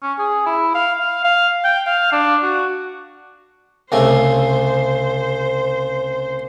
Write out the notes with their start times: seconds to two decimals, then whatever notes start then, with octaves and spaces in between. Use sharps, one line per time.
0.02 C#4
0.18 G#4
0.46 E4
0.75 F5
1.00 F5
1.24 F5
1.64 G5
1.86 F5
2.12 D4
2.43 F#4
3.92 C2 C#3 A3 C5